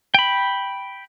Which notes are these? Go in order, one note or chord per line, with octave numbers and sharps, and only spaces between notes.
G5 B5